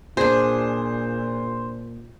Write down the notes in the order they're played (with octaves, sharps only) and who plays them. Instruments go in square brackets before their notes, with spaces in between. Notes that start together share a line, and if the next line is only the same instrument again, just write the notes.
[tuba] A#2 [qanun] D4 G#4 [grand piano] C5